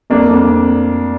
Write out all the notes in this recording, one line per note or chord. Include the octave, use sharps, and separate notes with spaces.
F2 A#3 D4
F2
F2